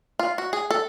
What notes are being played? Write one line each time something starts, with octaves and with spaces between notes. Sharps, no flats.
F4
F#4
G#4
A4